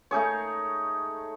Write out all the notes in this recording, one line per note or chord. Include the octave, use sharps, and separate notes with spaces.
A3 D#4 G#4 C#5